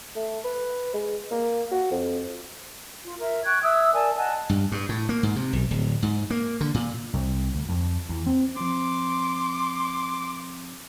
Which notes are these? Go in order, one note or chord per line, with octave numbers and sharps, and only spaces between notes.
A3
B4
G#3
A#3
F#4
F2
F4
A#4 E5
G5 C#6 F#6 G#6
E5 D#6 E6
A#4 D5 G#5 A5
D#5 F#5 G#5 A5
G2
G2
A2
A#3
G#2
C3
B1
D1
G#2
A#3
D3
A#2
C2
D2
F2
E2
C4
F3 C4 C6 D6